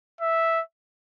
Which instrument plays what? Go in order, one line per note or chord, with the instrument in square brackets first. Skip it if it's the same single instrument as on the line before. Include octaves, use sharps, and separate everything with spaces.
[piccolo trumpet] E5